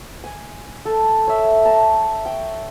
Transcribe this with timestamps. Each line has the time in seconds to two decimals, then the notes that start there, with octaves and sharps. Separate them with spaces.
0.24 G#5
0.85 A4
1.28 C#5 E5
1.65 A5 A#5
2.26 G5